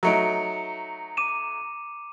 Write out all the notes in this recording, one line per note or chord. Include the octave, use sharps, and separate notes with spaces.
F#3 A3 D#4 A#5 C#7 D7
D6 D#7 E7